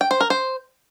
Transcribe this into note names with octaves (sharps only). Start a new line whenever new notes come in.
G5
C5
A#4
C5